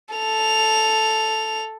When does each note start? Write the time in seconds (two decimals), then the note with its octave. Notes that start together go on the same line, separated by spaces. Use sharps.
0.15 A4 F7